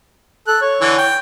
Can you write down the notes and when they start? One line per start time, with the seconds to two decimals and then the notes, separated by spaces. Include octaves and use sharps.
0.47 A4 F#6
0.61 C#5
0.81 D3 E3
0.98 G5